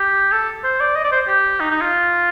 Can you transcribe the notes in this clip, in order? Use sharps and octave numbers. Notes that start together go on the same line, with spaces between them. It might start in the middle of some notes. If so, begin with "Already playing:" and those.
Already playing: G4
A4
C5
D5
D#5
D5
C5
G4
D#4
D#4
F4